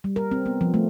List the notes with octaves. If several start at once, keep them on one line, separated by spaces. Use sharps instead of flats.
G3
A#4
C4
B3
F3
A3